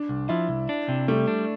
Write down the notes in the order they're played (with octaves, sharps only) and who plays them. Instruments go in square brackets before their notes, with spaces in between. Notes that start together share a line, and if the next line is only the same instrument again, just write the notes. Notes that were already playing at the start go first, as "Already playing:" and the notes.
Already playing: [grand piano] D4
[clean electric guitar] C2
[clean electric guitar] F3 [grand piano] E4
[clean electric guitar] C2
D4
C3
[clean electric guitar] G3 [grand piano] A3
[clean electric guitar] D4